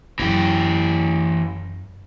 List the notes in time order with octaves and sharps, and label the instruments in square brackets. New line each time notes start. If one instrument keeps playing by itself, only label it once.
[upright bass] F#2 [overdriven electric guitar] E3 G4